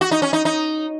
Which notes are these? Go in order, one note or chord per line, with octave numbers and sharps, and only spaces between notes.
F#4
D#4
C#4
D#4
D#4